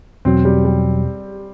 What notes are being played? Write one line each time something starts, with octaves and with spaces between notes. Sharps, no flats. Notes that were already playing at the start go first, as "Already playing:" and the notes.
E2 B2 F#3 C4
G3
G3